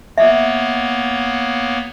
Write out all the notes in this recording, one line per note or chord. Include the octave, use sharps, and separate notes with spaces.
A#3 B3 C#5 E5